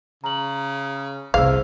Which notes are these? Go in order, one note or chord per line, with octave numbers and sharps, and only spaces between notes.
C#3 A#5 F#7
C2 C3 G#4 C5 F5 E6